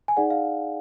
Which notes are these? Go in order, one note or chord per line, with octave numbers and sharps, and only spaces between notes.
G#5
D#4 G#4 D5 F#5
F5